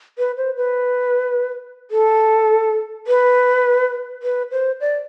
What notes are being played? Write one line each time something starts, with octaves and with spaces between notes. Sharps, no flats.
B4
C5
B4
A4
B4
B4
C5
D5